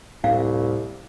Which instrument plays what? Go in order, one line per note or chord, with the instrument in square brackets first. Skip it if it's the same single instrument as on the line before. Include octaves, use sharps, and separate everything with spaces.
[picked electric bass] D1 A2 C4 [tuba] C2 [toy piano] F5